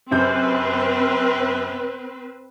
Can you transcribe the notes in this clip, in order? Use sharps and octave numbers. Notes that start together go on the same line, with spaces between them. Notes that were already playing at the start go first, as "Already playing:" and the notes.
F#2 C3 C4 B4 G6